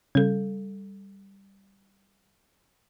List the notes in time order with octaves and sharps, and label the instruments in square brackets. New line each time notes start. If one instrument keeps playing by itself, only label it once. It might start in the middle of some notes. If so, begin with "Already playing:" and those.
[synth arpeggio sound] C#3 [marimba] G3 A4